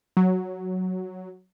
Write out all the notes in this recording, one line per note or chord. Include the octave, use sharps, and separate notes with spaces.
F#3